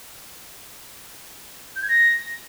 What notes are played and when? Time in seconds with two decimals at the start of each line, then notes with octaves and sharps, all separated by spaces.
1.76 G6
1.82 G#6
1.89 A#6